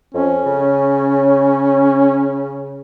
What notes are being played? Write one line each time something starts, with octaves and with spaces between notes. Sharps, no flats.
F2 C#4
C#3